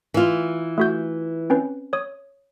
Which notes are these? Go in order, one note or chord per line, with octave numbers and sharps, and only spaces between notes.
E3 F4
A3 F#4 G6
C4 C#4 B4
C#5 D#6